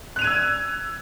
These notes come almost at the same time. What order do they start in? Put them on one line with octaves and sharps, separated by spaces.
F#6 F7 D#7 G#6 E6